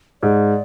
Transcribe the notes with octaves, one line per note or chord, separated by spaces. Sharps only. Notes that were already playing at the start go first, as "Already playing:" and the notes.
G#2 D5